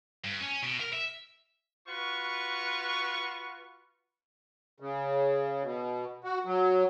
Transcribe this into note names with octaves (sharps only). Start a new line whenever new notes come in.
G2
C#4
B2
A#4
E5
F4 F#4 B4 C#6
C#3
B2
F#4
F#3